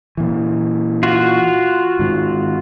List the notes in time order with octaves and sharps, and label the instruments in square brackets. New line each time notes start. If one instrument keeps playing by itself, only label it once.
[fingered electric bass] A#2 E3
[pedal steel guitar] F4 F#4
[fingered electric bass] G#2 D#3